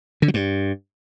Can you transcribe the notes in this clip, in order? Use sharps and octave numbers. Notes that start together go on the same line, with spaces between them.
D3
F#3
G2